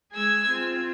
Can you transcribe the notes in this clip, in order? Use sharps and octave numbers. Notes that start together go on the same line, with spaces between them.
G#3 G#4 G#5 E6 G#6
C4 F4